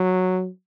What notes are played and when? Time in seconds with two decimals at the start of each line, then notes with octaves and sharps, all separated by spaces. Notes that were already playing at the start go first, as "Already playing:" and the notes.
Already playing: F#3